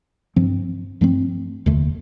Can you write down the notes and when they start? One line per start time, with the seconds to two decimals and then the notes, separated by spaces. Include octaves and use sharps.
0.36 G2 F3 C4
1.01 G2 F3 A3 C4
1.66 F1 D#2 D3 A3